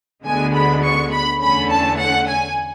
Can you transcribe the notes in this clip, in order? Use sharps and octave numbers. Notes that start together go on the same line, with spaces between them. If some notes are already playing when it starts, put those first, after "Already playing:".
D2 D3 G#3 B3 G#5
B5
C#6
B5
E2 D3 A3 C#4 B5
A5
F#5
G#5